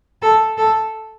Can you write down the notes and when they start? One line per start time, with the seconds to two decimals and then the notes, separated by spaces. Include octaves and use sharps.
0.22 A4
0.58 A4